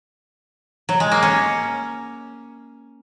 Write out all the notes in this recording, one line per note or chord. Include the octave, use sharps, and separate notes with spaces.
F#3
G#3
A#3
C#4